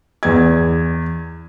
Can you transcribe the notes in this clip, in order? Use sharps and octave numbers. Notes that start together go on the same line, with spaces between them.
E2 G#6